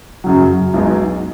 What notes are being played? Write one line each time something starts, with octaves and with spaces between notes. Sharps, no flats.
F#2 C#3 F#3
B1 B2 G#3 D#4